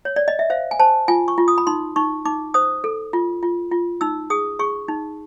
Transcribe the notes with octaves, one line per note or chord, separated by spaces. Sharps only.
C#5
D5
D#5
E5
C5 F5
G#5
C5 A5
F4 G#5
C#6
F4
D#6
B5
D#4 C6
D#4 C#6
D#4 D6
C5 D#6
A4
F4
F4
F4
D#4 E6
G#4 D#6
G#4 C#6
D#4